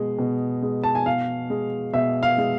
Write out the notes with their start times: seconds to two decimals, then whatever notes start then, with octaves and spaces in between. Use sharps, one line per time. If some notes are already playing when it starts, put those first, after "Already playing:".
Already playing: B2 G#3
0.19 B2
0.62 G#3
0.83 A5
0.95 G#5
1.06 B2 F5
1.50 G#3
1.94 B2 E5
2.23 F5
2.38 G#3